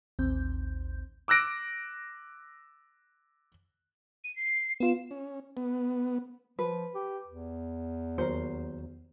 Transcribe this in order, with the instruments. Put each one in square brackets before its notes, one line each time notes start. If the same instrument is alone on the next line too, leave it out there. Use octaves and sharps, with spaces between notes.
[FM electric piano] A1 D#2 C4 G6
[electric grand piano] D6 E6 F#6 A#6 D7
[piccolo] D#7
C7
[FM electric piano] B3 F4 [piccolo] E7
[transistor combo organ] C#4
B3
[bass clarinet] F3 [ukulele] B4
[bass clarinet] G4
E2
[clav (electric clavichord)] D#2 F#3 A#4 [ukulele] C5